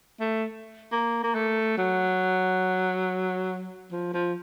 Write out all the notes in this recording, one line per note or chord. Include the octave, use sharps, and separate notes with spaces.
A3
A#3
A#3
A3
F#3
F3
F3